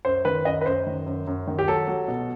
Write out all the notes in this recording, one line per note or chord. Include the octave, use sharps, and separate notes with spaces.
F#2 C5
D#3 B4
F#2 D#5
B4
F#2 C5
D#3
F#2
F#2
D#3
G4
F#3 A4
F#3
B2